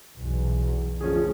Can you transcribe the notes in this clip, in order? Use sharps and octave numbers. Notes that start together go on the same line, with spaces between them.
B1 E2
D2 F3 C#4 G#4